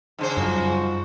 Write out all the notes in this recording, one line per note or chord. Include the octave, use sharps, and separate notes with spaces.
G#2 C#3 C5
F#2 F3 G3 F#4